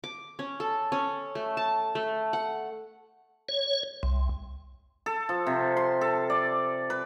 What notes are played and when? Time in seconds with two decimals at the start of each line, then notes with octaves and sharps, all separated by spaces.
0.04 D6
0.39 C#4
0.60 A4
0.92 C#4
1.35 A3
1.57 A5
1.95 A3
2.33 F#5
3.49 C#5
4.03 C2
5.06 A4
5.29 F3
5.46 C3
5.77 C6
6.01 A4
6.30 D5
6.90 B4